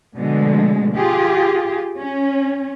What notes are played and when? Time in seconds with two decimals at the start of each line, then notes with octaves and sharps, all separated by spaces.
0.17 B2 D3 F3 G#3 A3
0.95 F4 G4 G#4
1.98 C#4